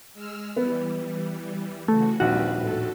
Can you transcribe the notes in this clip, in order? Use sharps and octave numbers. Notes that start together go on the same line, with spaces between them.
G#3 E6 F6
E3 G3 B3
C#3 E3 A3 F#4
A#1 D#2 G3 C4 F#4 B4
A2 A4